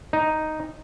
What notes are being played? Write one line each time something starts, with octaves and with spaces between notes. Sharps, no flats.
D#4